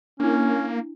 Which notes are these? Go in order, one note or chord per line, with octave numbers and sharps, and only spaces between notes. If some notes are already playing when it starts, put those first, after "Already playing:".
A#3 C#4 D4 E4